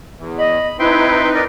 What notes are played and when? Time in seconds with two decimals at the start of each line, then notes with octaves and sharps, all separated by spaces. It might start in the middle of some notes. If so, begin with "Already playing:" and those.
0.17 E2
0.38 D#5 B5
0.79 C4 D#4 E4 B4 E5 G5 C6
1.34 A#4 D5 D#5